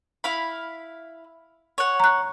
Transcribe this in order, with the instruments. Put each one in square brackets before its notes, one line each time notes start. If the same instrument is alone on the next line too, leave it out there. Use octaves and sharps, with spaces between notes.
[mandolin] E4 F5 B5
C#5 F#5
[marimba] A#5 F#6